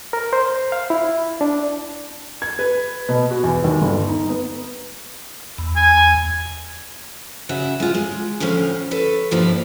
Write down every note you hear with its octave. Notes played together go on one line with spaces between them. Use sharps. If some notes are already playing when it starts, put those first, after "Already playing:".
A#4
C5
F5
E4
D4
G#6
B4
B2
F#4
E2
D#2
G1
D#4
B3
E2
G#5
C#3 F#4 E5
G#3 F4
G#3
D2 A2 F3 C#4 F5
A4 B4 C#5
G2 B2 F3 G3 A#3 E4